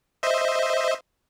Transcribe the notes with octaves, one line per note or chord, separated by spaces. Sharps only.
C5 D#5 E5